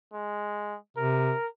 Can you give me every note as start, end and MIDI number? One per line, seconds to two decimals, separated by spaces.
0.13 0.77 56
0.97 1.33 48
0.97 1.47 70